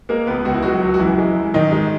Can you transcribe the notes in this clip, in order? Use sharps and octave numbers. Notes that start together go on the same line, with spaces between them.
G#3 A#3 A#4
C#2 B3 B4
C#2 F#4
E4
F#3 G#3 F#4
C#2
F#4
F#2 E3 E4
G#3
F#2
G#2 D#3 D#4
G#3